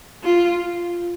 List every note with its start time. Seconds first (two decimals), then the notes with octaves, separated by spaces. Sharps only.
0.23 F4